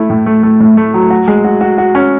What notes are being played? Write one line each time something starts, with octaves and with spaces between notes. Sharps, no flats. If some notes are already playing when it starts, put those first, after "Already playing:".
Already playing: A3 E4
A2
A3
A3
A2
A3
F#3
F#4
G#3
F#4
F#4
F#4
C#4